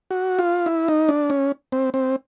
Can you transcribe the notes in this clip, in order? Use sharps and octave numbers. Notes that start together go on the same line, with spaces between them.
F#4
F4
E4
D#4
D4
C#4
C4
C4